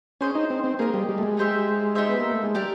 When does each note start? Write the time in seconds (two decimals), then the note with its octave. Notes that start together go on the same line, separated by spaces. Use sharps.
0.21 C#4 G#4 C5 D#5
0.35 D#4
0.50 C4
0.64 C4
0.79 A#3 G#4 C5 D#5
0.94 G3
1.09 G3
1.18 A3
1.23 G#3
1.37 D#4 G4 C5 E5
1.95 D#4 G4 C5 E5
2.09 B3
2.21 A#3
2.31 A3
2.44 G#3
2.55 G3 G4 A#4 D5